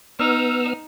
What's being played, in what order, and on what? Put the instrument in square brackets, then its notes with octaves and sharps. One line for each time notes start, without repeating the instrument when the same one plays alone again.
[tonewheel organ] B3 E6 F6 [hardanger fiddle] D#4